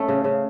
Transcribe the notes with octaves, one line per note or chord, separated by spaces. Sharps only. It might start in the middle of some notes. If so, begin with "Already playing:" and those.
Already playing: A3 C#4
C#3
C#3